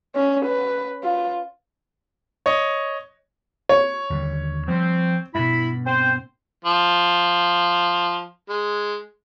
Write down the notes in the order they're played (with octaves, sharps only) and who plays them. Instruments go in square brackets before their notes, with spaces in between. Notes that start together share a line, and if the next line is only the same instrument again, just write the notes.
[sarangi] C#4
B4
F4
[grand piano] C#5 D#5
[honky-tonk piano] C#5
[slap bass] D#2 D3 G3
[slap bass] F3 G3 [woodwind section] C4
[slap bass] G2 B2 [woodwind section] E4 B5
[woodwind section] C4 C5
[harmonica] F3
G#3